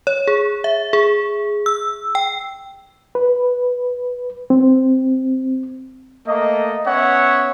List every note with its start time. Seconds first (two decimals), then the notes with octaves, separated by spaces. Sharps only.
0.07 C#5
0.28 G#4
0.64 E5
0.93 G#4
1.66 E6
2.15 G5
3.15 B4
4.50 C4
6.26 A3 A#3 D#5
6.86 B3 C#4 C#5 E5 F#5